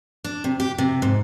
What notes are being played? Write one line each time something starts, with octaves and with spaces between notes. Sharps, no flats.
D4
C3
G4
C3
G#2